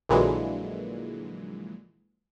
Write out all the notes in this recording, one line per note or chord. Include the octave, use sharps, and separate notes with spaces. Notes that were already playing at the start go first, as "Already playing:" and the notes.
A#1 A#2 D3 E3 F#3 G#3